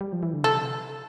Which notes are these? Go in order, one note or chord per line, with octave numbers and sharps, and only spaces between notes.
G3
F3
E3
D3
C3 A4